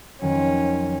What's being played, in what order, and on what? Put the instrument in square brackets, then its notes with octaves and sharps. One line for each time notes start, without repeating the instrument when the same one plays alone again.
[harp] F2 D#3 F#3 [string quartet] C#4